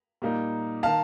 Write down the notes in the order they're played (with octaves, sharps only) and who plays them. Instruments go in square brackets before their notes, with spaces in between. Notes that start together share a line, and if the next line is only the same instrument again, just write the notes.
[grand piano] A#2 G3 A#3 D#4
D#3 F5 A5